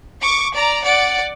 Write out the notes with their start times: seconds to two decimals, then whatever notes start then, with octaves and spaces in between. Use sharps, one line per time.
0.22 C#6 D6
0.56 D5 A#5
0.85 D5 F#5